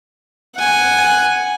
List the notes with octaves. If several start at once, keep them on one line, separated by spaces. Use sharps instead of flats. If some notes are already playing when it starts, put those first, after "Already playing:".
F#5 G#5